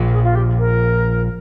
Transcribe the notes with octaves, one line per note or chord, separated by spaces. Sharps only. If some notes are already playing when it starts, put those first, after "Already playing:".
Already playing: A#1 A#2 F3
G#4
F4
G4
A#4